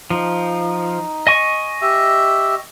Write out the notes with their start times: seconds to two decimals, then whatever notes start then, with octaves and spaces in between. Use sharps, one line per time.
0.10 F3 D#4
1.27 D#5 G#5 C#6
1.82 G4 E5